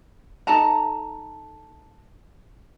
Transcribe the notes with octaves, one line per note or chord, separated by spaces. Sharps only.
D#4 A4 A5 A#5